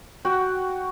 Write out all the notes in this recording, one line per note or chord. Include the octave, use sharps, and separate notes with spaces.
F#4 F#5 G5